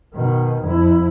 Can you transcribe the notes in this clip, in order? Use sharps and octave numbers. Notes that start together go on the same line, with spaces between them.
B2 D#3
F2 E4